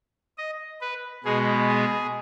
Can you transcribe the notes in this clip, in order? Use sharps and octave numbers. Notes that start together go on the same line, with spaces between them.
D#5
B4
B2 G#3 B3 G#4
G#4